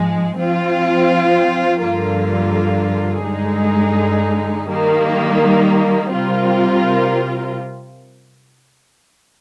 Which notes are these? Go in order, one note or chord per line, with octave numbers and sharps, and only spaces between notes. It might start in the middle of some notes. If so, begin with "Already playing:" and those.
Already playing: G#2 F3 G#3
F3 C4 F4
G2 D3 F3 A#3 F4
G2 D3 G#3 D#4 G#4
D#3 G3 A#3
C3 G3 C4 F4 A#4